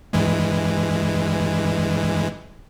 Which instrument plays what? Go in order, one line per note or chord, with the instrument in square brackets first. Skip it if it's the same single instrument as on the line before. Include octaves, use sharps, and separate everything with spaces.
[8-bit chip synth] G2 E3 G#3